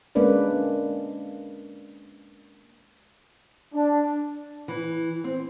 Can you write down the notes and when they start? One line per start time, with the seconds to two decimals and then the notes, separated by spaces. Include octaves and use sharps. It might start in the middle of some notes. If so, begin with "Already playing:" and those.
0.15 G#3 A#3 C#4 D4 B4 D5
3.73 D4
4.68 E3
5.24 C4